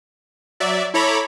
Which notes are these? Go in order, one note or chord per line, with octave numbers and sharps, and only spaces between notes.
F#3 D5 E5
E4 A4 C#5 A#5 B5 D6